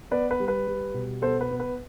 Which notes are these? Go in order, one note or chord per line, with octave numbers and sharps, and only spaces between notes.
B3 B4 D5
B4
G3
B4
G3
B2
B3 A4 C5
B4
B3
B4